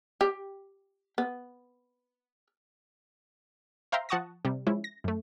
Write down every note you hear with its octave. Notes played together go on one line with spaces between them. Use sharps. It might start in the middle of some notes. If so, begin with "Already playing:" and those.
G4
B3
C5 E5 F5 G5 A#5 C6
F3 F#5 A5 C#6 D#6 A#6
C3 G3
F3 G#3 C#4 E4
A#6
F#2 A3